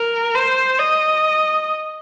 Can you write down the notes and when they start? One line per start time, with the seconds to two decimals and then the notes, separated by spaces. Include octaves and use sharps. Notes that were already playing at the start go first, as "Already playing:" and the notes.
Already playing: A#4
0.35 C5
0.79 D#5